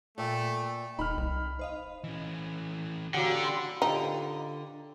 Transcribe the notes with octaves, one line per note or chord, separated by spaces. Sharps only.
A#2 A3 G5
D#1 D#4 B5 F6
C2
C5 D#5 F5
E3 C#4
D3 A#3 C#4 F#4 G4 F#5
G3 C6
D3 D#4 F4 G4